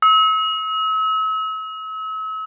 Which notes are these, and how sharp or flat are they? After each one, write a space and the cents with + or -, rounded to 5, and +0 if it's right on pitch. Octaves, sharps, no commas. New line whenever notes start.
E6 -40